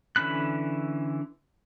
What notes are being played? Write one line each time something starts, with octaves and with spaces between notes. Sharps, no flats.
D3 E3 C#4 B5 F#6